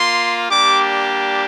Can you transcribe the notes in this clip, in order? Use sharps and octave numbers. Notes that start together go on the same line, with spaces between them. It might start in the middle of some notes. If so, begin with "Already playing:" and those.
Already playing: A#3 F4 C6
G3 A#3 D4 G4 D6